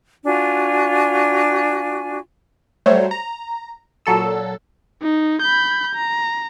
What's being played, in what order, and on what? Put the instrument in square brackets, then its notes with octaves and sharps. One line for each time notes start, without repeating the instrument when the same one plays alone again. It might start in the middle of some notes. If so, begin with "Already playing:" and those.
[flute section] D4 F4 F#4 G#5
[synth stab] F#3 G3 A3 C5 C#5
A#5
A#2 F#3 A4 E6
[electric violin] D#4
B5 G6
A#5